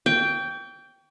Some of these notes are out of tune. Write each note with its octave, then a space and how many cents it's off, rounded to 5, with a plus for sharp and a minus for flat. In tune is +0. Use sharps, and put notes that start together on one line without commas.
G5 +0 C#6 +40